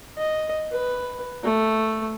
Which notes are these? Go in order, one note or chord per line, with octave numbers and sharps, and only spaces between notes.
D#5
B4
A3